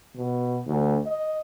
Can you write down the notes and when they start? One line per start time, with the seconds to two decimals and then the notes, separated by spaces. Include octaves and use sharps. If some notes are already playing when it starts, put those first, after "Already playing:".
0.16 B2
0.66 D2
1.07 D#5